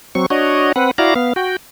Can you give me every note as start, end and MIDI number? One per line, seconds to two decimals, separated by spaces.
0.15 0.26 54
0.15 0.26 60
0.15 0.26 85
0.30 0.72 62
0.30 0.72 66
0.30 0.72 73
0.30 0.72 75
0.76 0.91 60
0.76 0.91 71
0.76 0.91 78
0.98 1.14 64
0.98 1.14 66
0.98 1.14 74
0.98 1.14 77
0.98 1.14 82
1.16 1.33 59
1.16 1.33 77
1.36 1.56 66
1.36 1.56 79